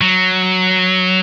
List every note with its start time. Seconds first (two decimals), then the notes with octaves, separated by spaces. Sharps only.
0.01 F#3